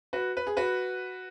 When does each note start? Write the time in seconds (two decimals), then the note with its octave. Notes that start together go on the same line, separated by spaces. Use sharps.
0.13 F#4 B4
0.37 B4
0.47 G#4
0.57 F#4 B4